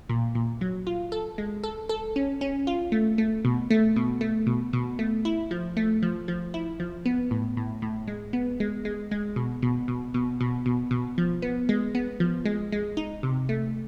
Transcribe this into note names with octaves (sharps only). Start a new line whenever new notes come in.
A#2
A#2
F#3
F4
A4
G#3
A4
A4
C#4
C#4
F4
A3
A3
B2
A3
B2
A3
B2
B2
A3
E4
F3
A3
F3
F3
E4
F3
B3
A2
A2
A2
G#3
B3
G#3
G#3
G#3
B2
B2
B2
B2
B2
B2
B2
F3
B3
G#3
B3
F3
G#3
G#3
D#4
C3
A3